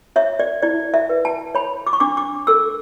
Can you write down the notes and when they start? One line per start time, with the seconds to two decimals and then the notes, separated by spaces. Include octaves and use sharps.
0.16 C#5 E5
0.39 D5
0.62 E4 D5
0.94 E5
1.09 B4
1.25 A5
1.55 C#5 B5
1.87 D6
1.93 C#6
2.00 D4 D6
2.17 D6
2.47 A4 E6